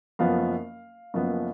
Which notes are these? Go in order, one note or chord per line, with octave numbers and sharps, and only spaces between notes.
F#1 F#2 F3 B3 F5
F#1 F#2 F3 B3